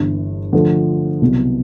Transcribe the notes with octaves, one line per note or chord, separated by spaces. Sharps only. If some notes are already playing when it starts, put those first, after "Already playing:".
Already playing: G1 G2 E3
D3 F3 A3
C2 B2 F#3